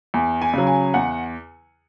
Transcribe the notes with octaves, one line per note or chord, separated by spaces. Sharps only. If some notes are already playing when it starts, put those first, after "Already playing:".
E2
G#5
C#3 F#3
G#5
E2 F#5